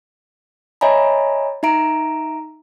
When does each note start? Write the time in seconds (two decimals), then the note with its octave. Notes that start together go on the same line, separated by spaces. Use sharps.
0.81 C#5 D#5 E5 G#5 A#5 B5
1.63 D#4 E5 A#5 D7